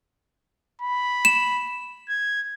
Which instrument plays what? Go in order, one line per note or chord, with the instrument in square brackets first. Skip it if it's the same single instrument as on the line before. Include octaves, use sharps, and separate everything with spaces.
[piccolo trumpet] B5
[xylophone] E7
[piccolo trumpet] G#6